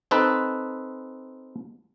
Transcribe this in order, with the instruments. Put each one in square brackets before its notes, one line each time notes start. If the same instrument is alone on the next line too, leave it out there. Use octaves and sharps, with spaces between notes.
[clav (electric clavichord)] C4 D#4 A4 B4